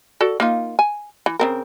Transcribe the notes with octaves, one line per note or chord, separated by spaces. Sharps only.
F#4 A4 D5
A#3 D#4 F4
G#5
E3
C#3 C4 A#4